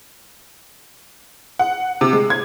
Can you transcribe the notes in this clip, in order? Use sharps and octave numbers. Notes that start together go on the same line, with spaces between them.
F#5
C3
G#3
G#6